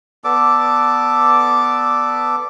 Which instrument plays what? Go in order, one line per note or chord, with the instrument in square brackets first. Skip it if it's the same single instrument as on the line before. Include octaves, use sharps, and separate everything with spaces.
[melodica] B3 A4 D5 D6